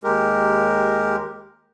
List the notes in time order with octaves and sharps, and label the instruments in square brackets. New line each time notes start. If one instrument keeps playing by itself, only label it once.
[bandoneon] D#2 G#3 G4 A#4